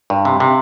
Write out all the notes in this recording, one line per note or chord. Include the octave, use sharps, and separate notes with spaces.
G2
C3
C3